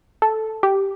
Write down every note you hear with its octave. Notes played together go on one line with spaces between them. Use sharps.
A4
G4